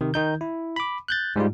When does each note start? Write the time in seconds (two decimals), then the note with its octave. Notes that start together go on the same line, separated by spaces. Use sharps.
0.01 C3 D#3
0.14 D#3 D#4 G6
0.41 E4
0.76 B5 D6
1.08 F#6 G6 A6
1.36 G#2 G3 G#3 F4